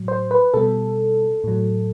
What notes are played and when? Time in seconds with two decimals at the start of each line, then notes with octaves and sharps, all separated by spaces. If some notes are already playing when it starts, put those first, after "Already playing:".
Already playing: A2 F#3
0.08 C5
0.31 B4
0.54 B2 G3 A4
1.44 A2 F#3